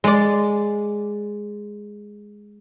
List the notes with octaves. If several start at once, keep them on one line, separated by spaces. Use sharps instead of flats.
G#3 D5